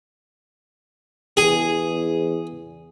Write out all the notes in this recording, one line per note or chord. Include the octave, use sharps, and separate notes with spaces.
E2 G#4